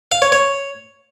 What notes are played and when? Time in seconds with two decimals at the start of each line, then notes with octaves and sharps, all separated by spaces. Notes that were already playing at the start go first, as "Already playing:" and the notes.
0.12 F5
0.22 C#5
0.32 C#5